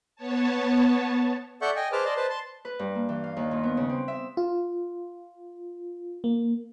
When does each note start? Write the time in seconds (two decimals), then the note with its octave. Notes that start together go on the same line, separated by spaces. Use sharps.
0.16 B3 C#5 A5
1.62 A4 D5 E5 F#5 C#6 G6
1.76 D#5 G5 G#5
1.92 G#4 B4 C5 A5 D6 F6
2.05 D5 D#5 A5 C6
2.16 B4 C5 A5
2.29 A5 C6
2.65 B4
2.79 G2
2.95 A#3
3.09 E3
3.24 F5
3.37 D#2
3.51 A#2
3.63 B3
3.77 C#3
3.89 C4
4.08 E5
4.37 F4
6.24 A#3